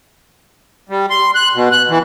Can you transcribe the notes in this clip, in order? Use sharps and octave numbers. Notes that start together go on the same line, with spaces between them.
G3
C6
F#6
B2
F#6
E3